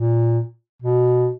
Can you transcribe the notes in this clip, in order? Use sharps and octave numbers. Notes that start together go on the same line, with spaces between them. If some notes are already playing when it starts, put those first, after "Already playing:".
Already playing: A#2
B2